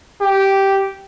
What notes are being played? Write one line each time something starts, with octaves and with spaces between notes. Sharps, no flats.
G4